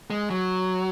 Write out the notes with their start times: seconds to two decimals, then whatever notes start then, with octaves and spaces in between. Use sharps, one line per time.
0.10 G#3
0.30 F#3